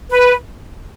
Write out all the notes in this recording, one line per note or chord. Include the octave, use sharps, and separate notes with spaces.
B4